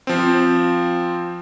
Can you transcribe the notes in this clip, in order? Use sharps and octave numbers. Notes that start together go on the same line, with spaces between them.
F3 C4